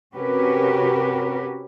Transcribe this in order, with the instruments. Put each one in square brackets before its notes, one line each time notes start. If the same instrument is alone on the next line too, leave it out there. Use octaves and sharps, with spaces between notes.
[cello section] C3 C#4 F#4 G4 A#4 B4